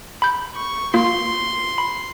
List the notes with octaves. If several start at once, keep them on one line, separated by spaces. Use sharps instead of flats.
B5 G6
C#6
A#3 F4 C6
B5